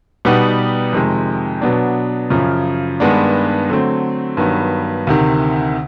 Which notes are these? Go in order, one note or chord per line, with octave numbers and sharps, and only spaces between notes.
B2 G3 B3 D#4 G4
F2 C3 D#3 G#3
B2 F#3 B3 D4
F#2 C#3 F3
G2 D#3 G#3 B3 D4
D3 F#3 A3 C4
G2 D#3 F#3 B3
D2 C3 D#3